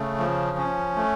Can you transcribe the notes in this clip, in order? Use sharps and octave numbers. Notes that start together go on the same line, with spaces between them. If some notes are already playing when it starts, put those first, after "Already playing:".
Already playing: C#3 A3
F3
C#4
A3